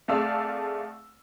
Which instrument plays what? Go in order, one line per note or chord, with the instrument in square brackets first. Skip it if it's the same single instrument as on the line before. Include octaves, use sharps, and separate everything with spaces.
[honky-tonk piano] C2 A3 G#4 D5 F5 E6